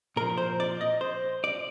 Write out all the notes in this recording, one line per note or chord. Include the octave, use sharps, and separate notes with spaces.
A#2 F3 A#4
C5
D5
D#5
C5
D5